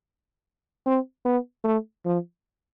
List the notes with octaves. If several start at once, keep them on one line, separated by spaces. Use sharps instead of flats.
C4
B3
A3
F3